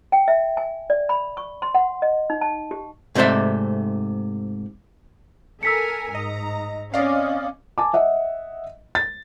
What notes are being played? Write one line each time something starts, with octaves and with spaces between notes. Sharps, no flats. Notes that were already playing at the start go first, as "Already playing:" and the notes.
G5
E5
G#5
D5
B5
C#6
C6
F#5
D#5
D#4
A5
G4
G#2 C3 A3 C5 D5 E5
A4 A#4 G#5 E6 B6 C#7
G#2 D#5 A#5
C4 C#4 D5 D#5 F5
G#5 A5 D6
D#5 E5 F#5
A6